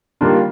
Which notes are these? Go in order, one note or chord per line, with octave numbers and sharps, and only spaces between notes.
D#3 G3 A#3 D4 F4